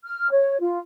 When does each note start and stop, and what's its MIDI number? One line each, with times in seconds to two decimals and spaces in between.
0.04 0.29 89
0.31 0.57 73
0.60 0.78 65